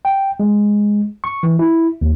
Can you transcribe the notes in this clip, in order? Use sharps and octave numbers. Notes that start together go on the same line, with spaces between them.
G5
G#3
C#6
E3
E4
D#2